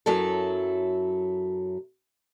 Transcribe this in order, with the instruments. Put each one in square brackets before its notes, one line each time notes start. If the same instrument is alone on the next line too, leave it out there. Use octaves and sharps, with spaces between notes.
[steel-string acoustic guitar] F#2 F#3 E4 A4